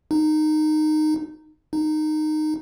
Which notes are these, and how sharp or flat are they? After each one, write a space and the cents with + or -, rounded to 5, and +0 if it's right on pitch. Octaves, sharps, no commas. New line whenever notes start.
D#4 -15
D#4 -15